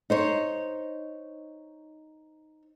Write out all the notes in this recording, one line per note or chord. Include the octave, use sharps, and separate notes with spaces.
D#4 C5 C#5